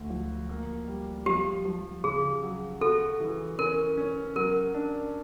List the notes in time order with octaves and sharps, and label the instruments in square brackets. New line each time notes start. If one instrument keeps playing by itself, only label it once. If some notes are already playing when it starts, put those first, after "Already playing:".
Already playing: [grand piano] D2
F3
A#3
G3
[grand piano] F3 [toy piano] G4
[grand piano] F3
[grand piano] C#3 [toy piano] G#4
[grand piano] F#3
[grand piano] F#4 [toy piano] A4
[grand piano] E3
[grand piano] C#4 [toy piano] A#4
[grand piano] C#4
[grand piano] F#3 [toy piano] A#4
[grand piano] D4